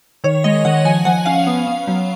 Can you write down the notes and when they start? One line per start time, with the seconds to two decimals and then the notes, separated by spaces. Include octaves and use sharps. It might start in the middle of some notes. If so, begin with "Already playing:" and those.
0.24 D#3 C#5
0.44 G#3 D#5
0.65 D#3 F#5
0.85 F3 G#5
1.05 F3 F#5
1.26 C#4 F5
1.47 B3
1.67 B3
1.87 F#3